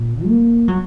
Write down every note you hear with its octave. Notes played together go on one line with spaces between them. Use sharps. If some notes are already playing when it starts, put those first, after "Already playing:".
Already playing: A#2
A#3
F#3